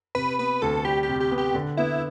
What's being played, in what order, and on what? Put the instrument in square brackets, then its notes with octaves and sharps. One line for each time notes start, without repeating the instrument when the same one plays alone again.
[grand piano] C3 [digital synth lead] B4
[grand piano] B3 [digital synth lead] B4
[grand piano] D2 [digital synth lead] A4
[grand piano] G3 [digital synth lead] G4
[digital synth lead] G4
[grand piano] C3
[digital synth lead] G4
[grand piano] B3
[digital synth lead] G4
[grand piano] D3
[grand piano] B3 [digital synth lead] E4